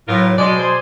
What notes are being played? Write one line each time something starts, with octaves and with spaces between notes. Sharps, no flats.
A2 F#3 B3 F4 A#4
B2 G#3 D5
G#4 C5